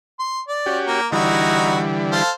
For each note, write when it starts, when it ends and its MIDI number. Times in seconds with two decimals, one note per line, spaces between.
0.19 0.40 84
0.48 0.78 74
0.66 1.01 61
0.66 1.01 66
0.66 1.01 67
0.87 1.07 58
1.12 2.23 50
1.12 2.23 52
1.12 2.23 55
1.12 1.83 63
1.12 1.83 64
1.12 1.83 66
2.12 2.30 69
2.12 2.30 72
2.12 2.30 77